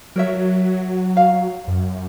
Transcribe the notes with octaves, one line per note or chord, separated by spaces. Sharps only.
F#3 A#4 C#5 E5
F5
F#2